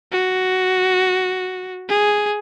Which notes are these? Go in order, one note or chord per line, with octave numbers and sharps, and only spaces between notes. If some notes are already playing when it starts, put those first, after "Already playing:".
F#4
G#4